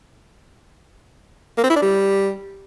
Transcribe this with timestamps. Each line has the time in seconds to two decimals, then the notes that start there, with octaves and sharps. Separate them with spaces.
1.58 A#3
1.64 C4
1.70 E4
1.76 D4
1.82 G3